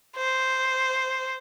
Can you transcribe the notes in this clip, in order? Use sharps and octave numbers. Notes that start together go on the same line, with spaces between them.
C5